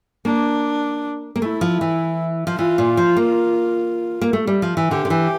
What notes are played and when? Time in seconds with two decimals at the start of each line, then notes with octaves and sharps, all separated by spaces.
0.25 A#3 D4
1.36 A#3
1.42 A3 E4
1.61 F3
1.81 E3
2.47 F3
2.58 E3 F4
2.78 A#2
2.97 F3
3.17 A#3
4.21 A#3
4.33 A3
4.47 G3
4.62 F3
4.77 E3
4.91 D3 G4
5.05 D3
5.10 E3